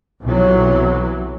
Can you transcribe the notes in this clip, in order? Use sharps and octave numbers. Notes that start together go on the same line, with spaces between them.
B1 C3 E3 F#3